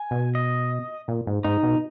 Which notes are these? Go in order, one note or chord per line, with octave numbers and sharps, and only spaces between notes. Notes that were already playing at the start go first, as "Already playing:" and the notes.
Already playing: G#5
B2
D#5
A#2
G#2
G#2 D#4
B2